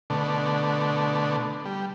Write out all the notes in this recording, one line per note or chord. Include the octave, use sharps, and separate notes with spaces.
B2 D3 A3
G3